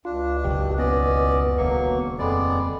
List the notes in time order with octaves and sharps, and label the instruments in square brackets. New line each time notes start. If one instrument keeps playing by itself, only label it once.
[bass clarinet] C#2 [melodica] D4 [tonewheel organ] F4
[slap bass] F#1 B1 F#2 [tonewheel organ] G4
[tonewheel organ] B3 [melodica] C#4 D5 D#5
[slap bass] D#1 D2 C#3 [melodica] F#3 A#3 C#6
[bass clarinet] F2 [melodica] G#3 B3 D5